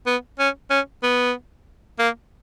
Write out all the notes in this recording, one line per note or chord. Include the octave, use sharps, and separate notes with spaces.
B3
C#4
C#4
B3
A#3